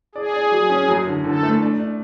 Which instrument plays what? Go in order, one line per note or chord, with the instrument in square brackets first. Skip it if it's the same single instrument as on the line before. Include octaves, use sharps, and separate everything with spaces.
[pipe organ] G#4 [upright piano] D5
[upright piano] D5
F#3
C#4
F#2
D3
[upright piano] D3 [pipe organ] A4
[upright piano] A3
D4
D4